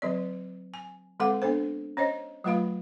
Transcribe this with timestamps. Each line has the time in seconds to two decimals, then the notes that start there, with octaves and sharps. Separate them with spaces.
0.02 D3 F#3 C4 D5
0.74 G#5
1.20 D3 G#3 C4 A4 F#5 D6
1.42 B3 D4 A4 C5
1.97 C#4 C5 C#5 D#5
2.44 F#3 A3 F4 B4 F5 B5